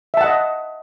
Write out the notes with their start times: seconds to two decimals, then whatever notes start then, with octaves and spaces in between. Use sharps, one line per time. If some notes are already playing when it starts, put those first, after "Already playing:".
0.14 E5
0.17 A5
0.21 F#5
0.24 D#5